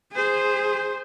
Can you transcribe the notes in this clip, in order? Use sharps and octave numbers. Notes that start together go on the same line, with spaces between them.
G#4 C5